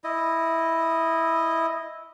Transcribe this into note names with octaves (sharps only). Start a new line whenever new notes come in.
E4 D#5